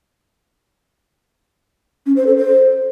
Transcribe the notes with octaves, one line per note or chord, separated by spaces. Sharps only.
C#4
C5
A4
C5